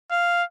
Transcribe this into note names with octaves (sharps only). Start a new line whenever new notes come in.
F5